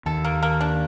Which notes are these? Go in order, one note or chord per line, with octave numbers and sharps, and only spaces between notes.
D#2 D#3 A4
A#3
A#3
D4